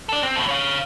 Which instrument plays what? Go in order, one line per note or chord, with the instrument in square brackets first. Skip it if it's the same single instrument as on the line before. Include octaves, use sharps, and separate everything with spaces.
[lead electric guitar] A4 D5
C4
F2 A2
C#5 F5